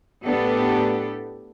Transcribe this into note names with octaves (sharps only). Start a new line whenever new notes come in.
A2 B3 D4 G4 A4